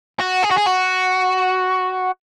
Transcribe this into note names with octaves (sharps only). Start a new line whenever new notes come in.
F#4
G#4
F#4
G#4
F#4